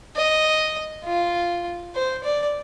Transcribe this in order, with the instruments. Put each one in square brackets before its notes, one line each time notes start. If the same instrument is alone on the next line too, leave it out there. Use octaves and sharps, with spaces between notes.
[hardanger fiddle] D#5
F4
C5
D5